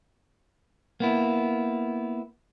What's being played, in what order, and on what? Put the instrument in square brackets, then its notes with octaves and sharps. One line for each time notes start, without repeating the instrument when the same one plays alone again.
[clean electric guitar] A#3 B3 E4